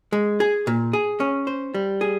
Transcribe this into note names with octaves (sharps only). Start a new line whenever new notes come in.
G#3
G#4
A#2
G#4
C#4
C5
G3
G#4